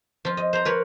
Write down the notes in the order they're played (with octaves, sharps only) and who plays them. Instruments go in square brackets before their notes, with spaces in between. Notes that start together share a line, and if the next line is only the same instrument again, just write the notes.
[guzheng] F3 F4
D#5
C5 A#5
A#4 B4 C#5